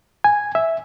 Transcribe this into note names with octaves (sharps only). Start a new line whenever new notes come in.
G#5
E5